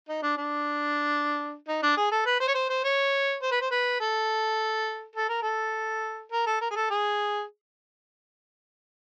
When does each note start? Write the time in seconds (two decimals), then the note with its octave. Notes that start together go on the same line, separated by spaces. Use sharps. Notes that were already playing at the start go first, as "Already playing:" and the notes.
0.09 D#4
0.22 D4
0.37 D4
1.68 D#4
1.83 D4
1.97 G#4
2.11 A4
2.26 B4
2.40 C5
2.48 C#5
2.54 C5
2.70 C5
2.84 C#5
3.42 C5
3.51 B4
3.61 C5
3.71 B4
4.00 A4
5.16 A4
5.29 A#4
5.43 A4
6.32 A#4
6.47 A4
6.61 A#4
6.71 G#4
6.76 A4
6.90 G#4